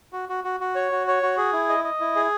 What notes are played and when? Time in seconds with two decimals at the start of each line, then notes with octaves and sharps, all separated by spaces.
0.13 F#4
0.29 F#4
0.44 F#4
0.60 F#4
0.75 C#5
0.92 F#4
1.07 C#5
1.23 F#4
1.37 G#4
1.53 E4
1.69 D#5
1.84 D#5
2.00 E4
2.16 G#4